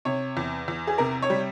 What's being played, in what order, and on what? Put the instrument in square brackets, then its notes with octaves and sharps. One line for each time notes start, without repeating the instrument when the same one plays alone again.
[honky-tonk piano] C3 C#5
E2
E2
G#4
C3 A#4
C#5
G3